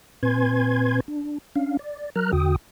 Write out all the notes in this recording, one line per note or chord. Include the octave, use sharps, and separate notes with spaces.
A#2 C4 B4 G#5 C6 G#6
D4
C#4 D4 F5
D5
F#3 A#4 A#5 F6 F#6
E2 D3 F#4 G5 D#6